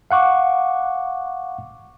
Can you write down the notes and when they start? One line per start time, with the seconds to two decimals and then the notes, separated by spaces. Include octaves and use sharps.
0.11 F5 F#5 C#6 D6